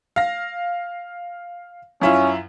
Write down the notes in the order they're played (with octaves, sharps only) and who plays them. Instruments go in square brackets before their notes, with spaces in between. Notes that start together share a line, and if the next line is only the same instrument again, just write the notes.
[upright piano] F5 A#6
[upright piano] F#2 E4 F4 [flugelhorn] C#4